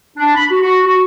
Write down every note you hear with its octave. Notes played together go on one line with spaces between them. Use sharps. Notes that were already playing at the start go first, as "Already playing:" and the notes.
D4
B5
F#4
F#4
F#4